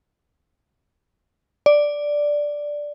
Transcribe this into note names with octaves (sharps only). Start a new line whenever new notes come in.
D5